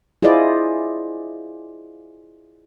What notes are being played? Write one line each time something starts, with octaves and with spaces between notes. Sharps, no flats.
E4 F4 G#4 C5 D5 D#5